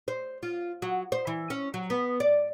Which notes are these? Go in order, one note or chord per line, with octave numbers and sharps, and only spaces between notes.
C5
F4
F#3
C5
E3
C#4
F#3
B3
D5